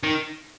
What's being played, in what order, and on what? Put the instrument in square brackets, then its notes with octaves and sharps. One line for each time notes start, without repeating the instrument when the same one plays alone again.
[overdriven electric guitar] D#3